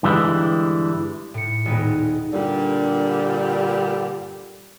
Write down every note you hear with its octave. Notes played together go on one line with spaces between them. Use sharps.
G2 D3 E3 G3 G#3 E4
A2 C#7
D#1 G#3 B3 D#4
G2 A#2 D3 G3